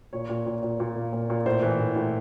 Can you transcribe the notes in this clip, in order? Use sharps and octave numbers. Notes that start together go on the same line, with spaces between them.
A#2 C#5
A#2
A#2
A#2
A#2
A#3
A#2
A#2
A2 C5
E3
A2
A2